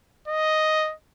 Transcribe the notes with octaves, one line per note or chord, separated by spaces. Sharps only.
D#5